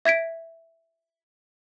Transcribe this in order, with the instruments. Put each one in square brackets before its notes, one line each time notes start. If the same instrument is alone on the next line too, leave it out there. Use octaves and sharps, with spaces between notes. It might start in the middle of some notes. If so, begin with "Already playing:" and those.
[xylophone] E5 G#6 B6 D7